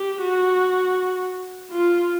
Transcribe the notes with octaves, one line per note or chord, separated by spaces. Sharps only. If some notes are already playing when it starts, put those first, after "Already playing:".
Already playing: G4
F#4
F4